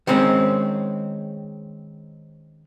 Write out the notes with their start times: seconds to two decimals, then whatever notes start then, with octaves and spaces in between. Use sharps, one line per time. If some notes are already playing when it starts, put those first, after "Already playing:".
0.07 D#3 G#3 C4 C#4